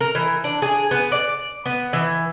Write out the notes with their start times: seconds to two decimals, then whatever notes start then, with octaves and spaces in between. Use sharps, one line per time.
0.01 A#4
0.15 E3
0.44 D4
0.62 G#4
0.91 B3
1.12 D5
1.66 B3
1.93 E3